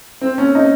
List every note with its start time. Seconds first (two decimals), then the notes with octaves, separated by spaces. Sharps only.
0.21 C4
0.38 C#4
0.55 D#4